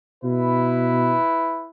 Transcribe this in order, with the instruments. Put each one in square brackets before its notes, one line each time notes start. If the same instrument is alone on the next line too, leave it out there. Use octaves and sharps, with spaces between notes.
[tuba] B2 [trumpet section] E4 B4